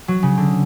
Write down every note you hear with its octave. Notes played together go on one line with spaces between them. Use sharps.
F#3
C#3
D3